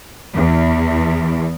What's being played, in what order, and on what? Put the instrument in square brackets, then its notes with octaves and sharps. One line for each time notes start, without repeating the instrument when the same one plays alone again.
[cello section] E2